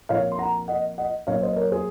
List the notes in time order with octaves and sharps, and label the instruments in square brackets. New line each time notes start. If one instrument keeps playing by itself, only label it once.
[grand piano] A#2 F3 C4 C#5 F5
C6
F#5 A#5
D#5 F#5
D#5 F#5
A#2 F#3 A#3 C#4 C#5 F5
C5 D#5
A#4 C#5
G#4 C5